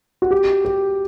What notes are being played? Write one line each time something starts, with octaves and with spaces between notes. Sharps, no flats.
F#4
G4
G4